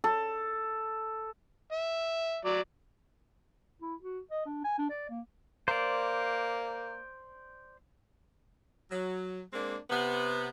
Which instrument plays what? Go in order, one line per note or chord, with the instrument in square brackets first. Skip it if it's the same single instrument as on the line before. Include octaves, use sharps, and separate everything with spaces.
[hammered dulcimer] A4
[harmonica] E5
F#3 D5
[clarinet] E4
F#4
D#5
D4
G#5
D4
D5
A#3
[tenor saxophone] A#3 [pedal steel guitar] C5 D5
[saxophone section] F#3
G#3 A#3 C4 D4
C3 B3